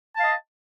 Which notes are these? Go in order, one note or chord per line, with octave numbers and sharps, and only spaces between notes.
D#5 F5 A5